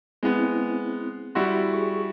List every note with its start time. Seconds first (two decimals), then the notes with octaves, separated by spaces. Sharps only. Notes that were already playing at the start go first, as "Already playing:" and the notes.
0.23 G#3 B3 C4 E4
1.35 G3 E4 F#4 C6
1.74 G#4 C#6